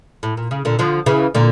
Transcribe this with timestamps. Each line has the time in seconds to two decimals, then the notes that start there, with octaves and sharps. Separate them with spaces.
0.23 A2
0.37 A#2
0.51 C#3
0.65 A#2 D3
0.79 D3 F3
1.06 C#3 E3
1.34 A#2 D3